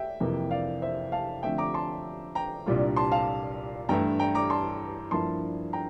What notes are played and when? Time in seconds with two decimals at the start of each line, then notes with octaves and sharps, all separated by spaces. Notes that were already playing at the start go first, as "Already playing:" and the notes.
Already playing: E5 G5
0.20 F2 C3 E3 A#3
0.51 D5 F5
0.82 C5 E5
1.12 F5 A5
1.43 D3 F3 A3 C4 E5 G5
1.58 A#5 D6
1.74 A5 C6
2.35 G5 A#5
2.66 C2 A#2 G3 D4 F4
2.96 A5 C6
3.12 F5 A5
3.89 G2 E3 A3 E4 G5 A#5
4.19 G5 A#5
4.35 A#5 D6
4.50 A5 C6
5.11 G2 F3 A#3 E4 A5 C6
5.73 G5 A#5